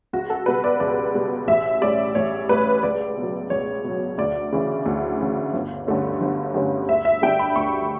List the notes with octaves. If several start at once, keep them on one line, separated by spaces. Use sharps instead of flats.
C#2 F#4
A4
B2 G3 B4
D5
C#2 D5
B2 G3
A1 E5
A2 G3 C#4 D5
A1 C#5
A2 G3 C#4 B4
C#2 D5
B2 F#3
C#2 C#5
B2 F#3
D2 D5
C#3 E3
D2
C#3 E3
G1
G2 D3 A3 C#4
G1
G2 D3 A3 C#4
D2 E5
E5
D3 G3 D4 G5
B5
D2 C#6